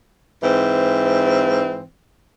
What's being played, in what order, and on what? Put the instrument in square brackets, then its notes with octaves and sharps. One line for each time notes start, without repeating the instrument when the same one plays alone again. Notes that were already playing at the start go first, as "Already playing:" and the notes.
[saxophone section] G#2 E3 C4